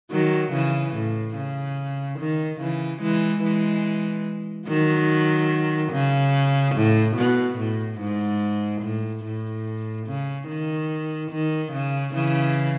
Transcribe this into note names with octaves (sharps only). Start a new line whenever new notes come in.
D#3 F#3
C#3 E3
A2
C#3
D#3
C#3 E3
E3 G#3
E3 G#3
D#3 F#3
C#3
A2
B2
A2
G#2
A2
A2
C#3
D#3
D#3
C#3
C#3 E3